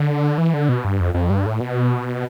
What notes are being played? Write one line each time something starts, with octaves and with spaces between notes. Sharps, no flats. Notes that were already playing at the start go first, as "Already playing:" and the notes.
Already playing: D3
E3
D3
B2
G2
F2
F2
G2
A2
B2